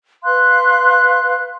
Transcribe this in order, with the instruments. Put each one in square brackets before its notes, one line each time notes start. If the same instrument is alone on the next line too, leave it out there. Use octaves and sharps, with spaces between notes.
[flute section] B4 F5 C6 F#6